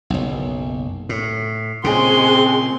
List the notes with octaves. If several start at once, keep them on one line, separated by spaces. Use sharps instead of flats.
F#1 B1
A2
A#2 C#3 G#3 C4 C6